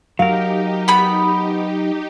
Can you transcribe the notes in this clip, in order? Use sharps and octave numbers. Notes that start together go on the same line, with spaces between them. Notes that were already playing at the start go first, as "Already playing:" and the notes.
F#3 D#4 G4 A#4 F5
B3 B5